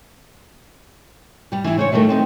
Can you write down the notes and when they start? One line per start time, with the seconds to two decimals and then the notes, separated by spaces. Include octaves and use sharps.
1.52 G3 G4
1.64 E3 E4
1.78 C#3 C5 C#5
1.92 D#3 F3 G3 A3 A#4
2.09 C4 D#4 G4